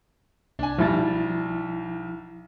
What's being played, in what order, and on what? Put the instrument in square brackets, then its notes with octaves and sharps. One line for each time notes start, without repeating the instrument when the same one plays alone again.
[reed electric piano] C2 [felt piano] D4 G#5
[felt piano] B1 G3 [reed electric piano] F3 E4 A6